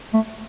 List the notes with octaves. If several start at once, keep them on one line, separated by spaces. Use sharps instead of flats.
A3